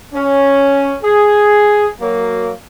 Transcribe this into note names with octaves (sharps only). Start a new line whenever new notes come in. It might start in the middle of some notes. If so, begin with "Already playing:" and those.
C#4
G#4
F#3 A#3